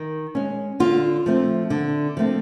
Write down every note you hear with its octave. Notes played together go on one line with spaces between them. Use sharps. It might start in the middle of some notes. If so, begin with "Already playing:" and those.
Already playing: D#3
G#3 C#4
D3 F4
F3 A3 C4
D3
F3 A3 C4